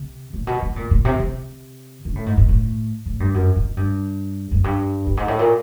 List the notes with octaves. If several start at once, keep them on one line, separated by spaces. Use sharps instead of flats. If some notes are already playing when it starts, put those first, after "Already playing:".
Already playing: C3
A#2
B2
C3
A#2
A#2
C3
C3
C#3
A2
G#2
G#2
A2
A2
G2
F#2
G#2
G2
F#2
G2
G2
G#2
A2
A#2